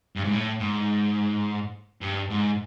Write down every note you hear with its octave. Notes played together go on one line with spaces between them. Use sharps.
G2
G#2
A2
G#2
G2
G#2